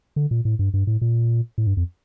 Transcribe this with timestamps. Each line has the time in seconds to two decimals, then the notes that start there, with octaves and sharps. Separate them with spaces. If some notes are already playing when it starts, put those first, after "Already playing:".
0.16 D3
0.31 A#2
0.45 A2
0.59 G2
0.74 G2
0.87 A2
1.02 A#2
1.58 A2
1.67 G2
1.77 F2